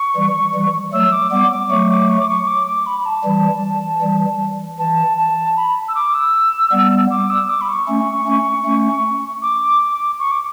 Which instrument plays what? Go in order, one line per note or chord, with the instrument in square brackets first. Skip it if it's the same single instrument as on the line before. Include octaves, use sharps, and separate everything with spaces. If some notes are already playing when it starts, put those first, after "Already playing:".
Already playing: [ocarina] C#6
[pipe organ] E3 G3
E3 G3
[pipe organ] F#3 A3 [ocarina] E6
[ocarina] D6
[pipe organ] G3 B3 [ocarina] D6
[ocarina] D6
[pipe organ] F#3 A3 [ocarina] C#6
[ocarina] D6
C#6
D6
C#6
D6
D6
B5
B5
A5
[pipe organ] E3 G3
E3 G3
[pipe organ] E3 [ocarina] A5
[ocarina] A5
B5
E6
D6
E6
[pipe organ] G3 B3
[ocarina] D6
E6
D6
B5
C#6
[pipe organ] A3 C#4
A3 C#4
A3 C#4
[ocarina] D6
C#6
D6